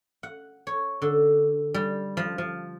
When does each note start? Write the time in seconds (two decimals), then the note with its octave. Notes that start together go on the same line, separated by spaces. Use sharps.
0.23 F#5
0.67 C#5
1.02 D3
1.74 G3
2.17 F3
2.38 F3